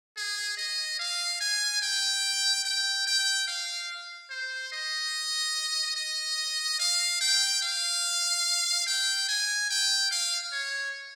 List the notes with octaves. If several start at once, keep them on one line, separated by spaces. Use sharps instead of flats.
G#4
D#5
F5
G#5
G5
G5
G5
F5
C5
D#5
D#5
F5
G5
F5
G5
G#5
G5
F5
C#5